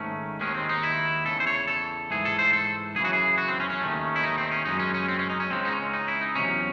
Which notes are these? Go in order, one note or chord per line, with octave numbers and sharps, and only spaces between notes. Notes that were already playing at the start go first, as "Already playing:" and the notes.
Already playing: G#2 D#3 A3 C#4
D#2 D#3 G#3 C#4
C4
D#4
E4
E2 C#3 E3 A4
C5
C#5
A4
G#2 E3 A3 G#4
A4
C5
A4
F#2 C#3 E3 G#4
F#4
G#4
F#4
C4
C#4
C#4
D#2 D#3 A3
E4
D#4
C4
C#4
F#2 C#3 G#3 D#4
C#4
C#4
C4
C#4
D#4
C#4
C#2 C#3 G#3 C4
D#4
C#4
D#4
E4
D#4
E2 C3 F#3 C#4